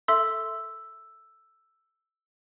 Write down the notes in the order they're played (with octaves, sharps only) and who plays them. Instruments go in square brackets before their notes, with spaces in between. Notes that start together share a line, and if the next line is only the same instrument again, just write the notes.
[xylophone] A4 E5 C6 [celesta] E6